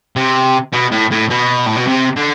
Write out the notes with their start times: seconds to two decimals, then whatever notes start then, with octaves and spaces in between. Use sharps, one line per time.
0.16 C3
0.73 B2
0.92 A2
1.11 A2
1.30 B2
1.67 A2
1.77 B2
1.88 C3
2.16 D3